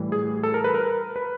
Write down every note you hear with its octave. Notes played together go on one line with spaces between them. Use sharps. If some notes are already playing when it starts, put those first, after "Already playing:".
Already playing: A2 E3 G3
G#4
A4
A#4
B4
A#4
B4